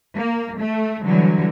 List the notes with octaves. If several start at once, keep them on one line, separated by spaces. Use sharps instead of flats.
A#3
A3
D3 E3 F#3 G3